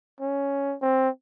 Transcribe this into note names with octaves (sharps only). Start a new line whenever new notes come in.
C#4
C4